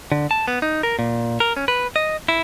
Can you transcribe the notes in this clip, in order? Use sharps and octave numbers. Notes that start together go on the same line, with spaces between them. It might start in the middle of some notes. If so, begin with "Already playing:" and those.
D3
A5
B3
D#4
A#4
A#2
A#4
C#4
B4
D#5
E4